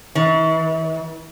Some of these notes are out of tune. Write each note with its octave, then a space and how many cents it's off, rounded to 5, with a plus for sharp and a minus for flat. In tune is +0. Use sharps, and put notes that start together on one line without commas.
E3 -40